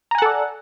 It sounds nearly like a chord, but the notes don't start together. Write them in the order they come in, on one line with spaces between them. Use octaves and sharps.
A#5 G#5 F#5 A4 D5